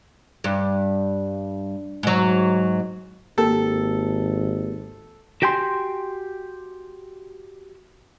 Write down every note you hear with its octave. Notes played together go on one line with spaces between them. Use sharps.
G2
G#2 F#3
G#1 A#3 G4 A4 A#4
F#4 G4 G5 G#5 C6